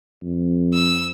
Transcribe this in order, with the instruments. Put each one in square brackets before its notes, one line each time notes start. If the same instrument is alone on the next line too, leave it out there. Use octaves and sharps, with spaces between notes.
[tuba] F2
[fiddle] E6